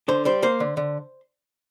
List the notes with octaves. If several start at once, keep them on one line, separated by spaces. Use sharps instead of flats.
D3 C5
G3 C5
A#3 C5
D3
D3